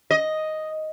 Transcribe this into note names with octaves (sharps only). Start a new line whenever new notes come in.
D#5